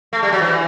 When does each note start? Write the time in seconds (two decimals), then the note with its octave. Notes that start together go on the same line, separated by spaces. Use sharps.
0.13 A3
0.23 G3
0.32 F#3
0.41 E3